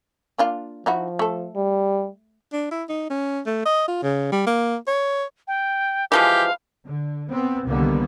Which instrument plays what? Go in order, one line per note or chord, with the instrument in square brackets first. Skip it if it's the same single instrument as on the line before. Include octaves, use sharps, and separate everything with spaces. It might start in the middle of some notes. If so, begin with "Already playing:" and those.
[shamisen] A#3 D4 F4
[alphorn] F3 [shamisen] D#4 E4 F#4
[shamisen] A3 A4
[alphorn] G3
[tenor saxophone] D4
E4
D#4
C#4
A3
D#5
F4
C#3
G3
A#3
C#5
[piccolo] G5
[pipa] E3 F3 G#3 [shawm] G4 [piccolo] F5
[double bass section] D3
B3 C4
C2 D3 D#3 G3 A#3 B3